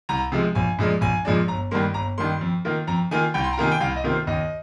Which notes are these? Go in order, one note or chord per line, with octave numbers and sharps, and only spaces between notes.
C2 A#5
C3 F3 G#3
A#1 G#5
A#2 F3 G#3 D4
A#1 G#5
A#2 F3 G#3 D4
G1 A#5
G2 D#3 G3 A#3 C6
G1 A#5
G2 D#3 G3 A#3 C6
F2
D#3 A#3 F4
F2 A#5
D#3 A#3 F4 G#5
C2 G5
C6
A#5
C3 D#3 A#3 F4 G#5
G5
C2 F5
D#5
C3 D#3 A#3 F4
C5
D#2 D#5